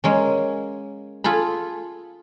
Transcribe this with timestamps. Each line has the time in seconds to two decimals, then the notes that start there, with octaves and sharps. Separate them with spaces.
0.04 G#3 A#3 C#4
1.24 F4 G#4 A4 B5